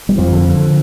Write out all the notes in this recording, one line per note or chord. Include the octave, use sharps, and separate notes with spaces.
G3
F2 F3
D3
D3